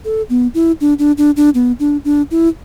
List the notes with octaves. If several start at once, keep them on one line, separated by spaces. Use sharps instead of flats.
A4
B3
E4
D4
D4
D4
D4
B3
D4
D4
E4